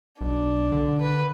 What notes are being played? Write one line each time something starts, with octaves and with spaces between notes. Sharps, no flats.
B1 D4
D3
B4